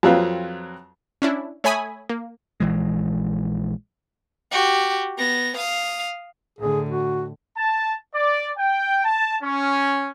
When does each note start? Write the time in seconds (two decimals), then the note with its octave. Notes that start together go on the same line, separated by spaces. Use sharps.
0.03 F2 F#3 C4 F4 B4
1.22 C#4 D4 E4
1.64 A3 C#5 E5 G#5 B5 D#6
2.09 A#3
2.60 A#1 E3 G#3
4.52 F#4 G4
5.18 B3 A#6
5.57 F5 D#6
6.58 A2 D3 G#4
6.89 F#4
7.56 A5
8.14 D5
8.57 G5
9.05 A5
9.43 C#4